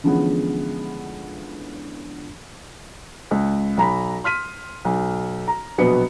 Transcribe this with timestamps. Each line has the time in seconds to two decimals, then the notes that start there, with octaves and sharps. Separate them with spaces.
0.04 D3 E3 F3 G#3 B3 C#4
3.31 C#2
3.77 B1 A#5 B5
4.24 C6 F6 B6 D#7
4.85 B1
5.48 A#5
5.78 A#1 B2 F#3 B3 B4 C#7